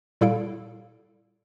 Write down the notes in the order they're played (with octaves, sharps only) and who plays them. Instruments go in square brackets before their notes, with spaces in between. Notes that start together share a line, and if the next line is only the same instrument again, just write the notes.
[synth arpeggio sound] A#2 G3 E4 A4 F5 D7